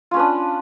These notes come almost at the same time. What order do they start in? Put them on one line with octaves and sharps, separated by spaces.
F4 C#4 B4 D4